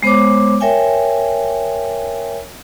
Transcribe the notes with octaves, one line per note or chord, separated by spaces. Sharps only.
G#3 B3 C5 C#5 D6
A#4 C#5 E5 G5 G#5